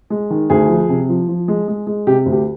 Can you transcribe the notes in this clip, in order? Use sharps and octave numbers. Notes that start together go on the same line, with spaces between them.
G#3
D#3
D2 G#4
F3
C3
F3
F3
G#3
G#3
G#3
C3 G4
D2
G4